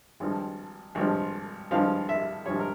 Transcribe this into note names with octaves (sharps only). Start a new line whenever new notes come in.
G#1 G2 F3
G#1 G2 F3
G#1 G2 F3 F5
E5
G#1 G2 F3 C#5
A#4